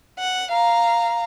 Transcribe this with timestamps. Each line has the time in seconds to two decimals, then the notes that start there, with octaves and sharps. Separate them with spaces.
0.19 F#5
0.51 F5 A#5